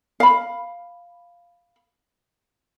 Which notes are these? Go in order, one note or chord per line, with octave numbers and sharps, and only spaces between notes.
F5 B5